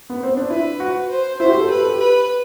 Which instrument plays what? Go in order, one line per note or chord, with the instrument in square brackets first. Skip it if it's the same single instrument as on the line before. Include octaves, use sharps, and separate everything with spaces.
[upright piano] B3
C4
D4
[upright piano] E4 [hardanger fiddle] B4
[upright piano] F#4
[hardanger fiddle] C5
[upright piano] E4 [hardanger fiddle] C5
[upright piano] F#4
G4
A4
[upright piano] G4 [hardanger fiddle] B4
[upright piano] A4
G4
[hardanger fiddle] B4